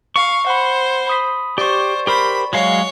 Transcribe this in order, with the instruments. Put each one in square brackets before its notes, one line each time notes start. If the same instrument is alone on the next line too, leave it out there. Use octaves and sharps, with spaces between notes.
[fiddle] F5 [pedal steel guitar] C#6
[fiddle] C5 [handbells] F#5 B5
[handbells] B5 D#6 B6
[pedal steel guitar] G4 [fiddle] C5 [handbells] D5 C#6
[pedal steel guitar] G4 A#4 C5 [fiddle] B5
[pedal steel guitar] F#3 G#3 F5 [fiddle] C#5